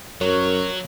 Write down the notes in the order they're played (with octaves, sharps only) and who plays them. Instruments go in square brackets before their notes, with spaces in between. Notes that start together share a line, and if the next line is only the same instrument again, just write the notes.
[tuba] F#2 [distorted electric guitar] F#3 [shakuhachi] A#4 [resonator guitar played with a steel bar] C#5